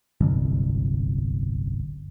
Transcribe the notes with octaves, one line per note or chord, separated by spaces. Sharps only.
D1 G1 C2